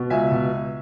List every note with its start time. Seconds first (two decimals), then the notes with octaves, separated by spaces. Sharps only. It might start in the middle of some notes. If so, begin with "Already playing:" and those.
Already playing: B2
0.10 C#2 E5 G#5
0.32 B2